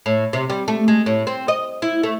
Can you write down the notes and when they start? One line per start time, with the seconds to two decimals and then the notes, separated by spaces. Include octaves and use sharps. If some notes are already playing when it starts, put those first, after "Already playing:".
0.06 A2
0.33 C3
0.50 G3
0.68 A3
0.88 G#3
1.06 A2
1.27 C4
1.48 D#5
1.82 E4
2.03 A3